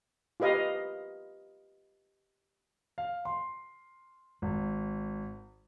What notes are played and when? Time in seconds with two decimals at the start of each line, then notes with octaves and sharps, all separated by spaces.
0.40 F4 G4 B4 D#5 F5
2.98 F5
3.25 C6
4.42 G#1